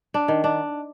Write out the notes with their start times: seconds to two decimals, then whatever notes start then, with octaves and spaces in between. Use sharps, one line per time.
0.14 D4
0.28 D#3
0.44 D4